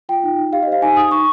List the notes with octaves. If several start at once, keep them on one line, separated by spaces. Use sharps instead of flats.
F4 G5
D#4
D#4
G4 F5
D#5
C5 F5
D#4 G#5
D#4 D#6
D#4 C#6